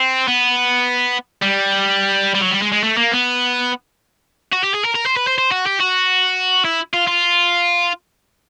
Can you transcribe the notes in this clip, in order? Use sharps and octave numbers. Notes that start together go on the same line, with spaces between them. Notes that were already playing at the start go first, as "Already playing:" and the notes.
Already playing: C4
B3
G3
G3
F#3
G3
G#3
G#3
A3
A#3
B3
F#4
G4
G#4
A#4
A#4
C5
B4
C5
C5
F#4
G4
F#4
E4
F4
F4